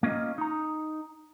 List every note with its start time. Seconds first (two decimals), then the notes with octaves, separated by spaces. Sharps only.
0.03 A#3 C#4 F4 D#5
0.38 D#4 A#5